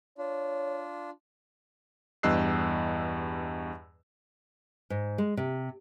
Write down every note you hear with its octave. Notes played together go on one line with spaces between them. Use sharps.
D4 F4 C#5
E2 G2 D#5 E6 F#6 C7
G#2
G#3
C3